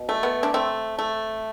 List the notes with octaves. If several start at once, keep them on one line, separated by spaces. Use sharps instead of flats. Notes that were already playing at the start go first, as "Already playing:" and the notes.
Already playing: B2
A3
B3
D4
A3 C4
A3